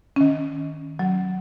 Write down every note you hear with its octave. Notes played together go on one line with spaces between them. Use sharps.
D#3 C#4
F#3